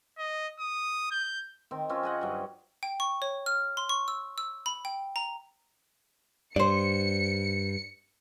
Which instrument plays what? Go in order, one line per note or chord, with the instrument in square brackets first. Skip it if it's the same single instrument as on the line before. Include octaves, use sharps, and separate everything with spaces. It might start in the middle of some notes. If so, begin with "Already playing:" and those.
[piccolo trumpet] D#5
D#6
G6
[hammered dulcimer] D#3 C4
C4 C#4 F4
G#4 D#5 F#5
G2 F#3
[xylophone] G5
C#6
C#5
F6
C6
C#6
E6
E6
B5
G5
A#5
[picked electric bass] G2 [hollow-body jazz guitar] C5 D5 [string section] C#7